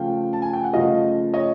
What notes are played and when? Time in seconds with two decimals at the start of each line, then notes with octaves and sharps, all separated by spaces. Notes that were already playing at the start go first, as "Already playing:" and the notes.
Already playing: C#3 F3 A3 F5 G5
0.33 A5
0.42 G#5
0.53 G5
0.64 F#5
0.73 C#3 F3 A3 D#5 F5
1.34 C#5 D#5